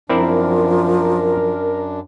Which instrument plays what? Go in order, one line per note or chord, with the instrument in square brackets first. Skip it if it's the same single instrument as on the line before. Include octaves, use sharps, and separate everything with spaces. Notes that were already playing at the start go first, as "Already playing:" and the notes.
[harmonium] F#2 D4 [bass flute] F3 [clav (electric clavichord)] C4 E4 D5 [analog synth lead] A#4